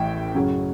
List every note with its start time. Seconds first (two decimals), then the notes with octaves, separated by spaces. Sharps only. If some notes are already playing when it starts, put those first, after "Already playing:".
Already playing: A1 A2 E3 E5 G5
0.35 F#2 C#3 F#3